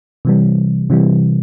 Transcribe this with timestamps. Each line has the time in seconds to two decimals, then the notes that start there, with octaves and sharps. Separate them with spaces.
0.25 C3 E3 G3
0.90 C3 E3 G3